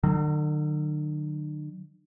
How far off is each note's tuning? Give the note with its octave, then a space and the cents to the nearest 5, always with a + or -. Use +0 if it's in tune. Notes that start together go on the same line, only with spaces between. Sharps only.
D3 +45 F#3 +0